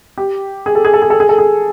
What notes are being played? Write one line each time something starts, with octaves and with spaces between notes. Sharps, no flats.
G4
G#4
A4
G#4
A4
G#4
A4
G#4
A4
G#4